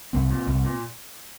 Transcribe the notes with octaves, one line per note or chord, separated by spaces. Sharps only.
C2 C4
A#2
C2
A#2